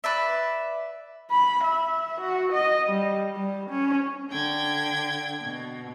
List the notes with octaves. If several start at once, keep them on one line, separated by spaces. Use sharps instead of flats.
B4 D5 E5
B5
E5
F#4
D#5
G3
G3
C#4
D3 G5 G#6
B2